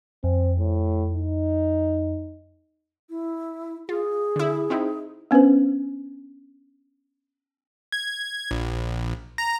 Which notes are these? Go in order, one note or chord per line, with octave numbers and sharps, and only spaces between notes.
F2 C4
A2
D#4
E4
F4 G#4
D3 E4
C4 D#4 E4
B3 C#4 D4 B4 C5
G#6
A#1
A#5